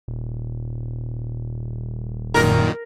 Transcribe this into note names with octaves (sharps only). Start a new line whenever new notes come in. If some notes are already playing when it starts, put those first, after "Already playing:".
D#1
F#2 A#2 D#3 A#4